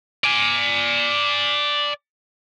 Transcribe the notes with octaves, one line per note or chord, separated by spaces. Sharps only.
D5 G#5